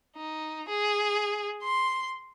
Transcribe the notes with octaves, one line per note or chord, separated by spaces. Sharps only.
D#4
G#4
C6